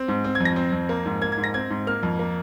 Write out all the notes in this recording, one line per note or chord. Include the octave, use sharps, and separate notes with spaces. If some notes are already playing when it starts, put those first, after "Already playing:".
Already playing: C4
G#2
C4
G#6
F2
A#6
C4
F2
A#3
G#2
A#3 G#6
G#6
G#2
A#6
C4 G#6
G#2
A#3 F6
F2
A#3